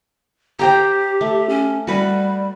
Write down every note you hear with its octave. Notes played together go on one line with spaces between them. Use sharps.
G4 C5 G5 A#5
A3
C#4
G3 F#4 B4